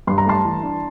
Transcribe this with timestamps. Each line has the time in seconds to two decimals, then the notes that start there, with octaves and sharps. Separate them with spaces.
0.07 G2 C6
0.18 A#5
0.26 A3 A5 C6
0.45 E3
0.63 D4